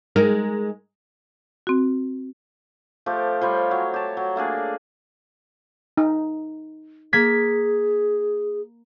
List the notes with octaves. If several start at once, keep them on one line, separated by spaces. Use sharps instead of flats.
G#3 D#4 A#4
C4 F#4
F3 A3 G4 D6
F3 G3 C#5 C6
F#3
G4 A5
F#3
A3 A#3 D4 G#4
D#4
A#3 G#4 G#6 B6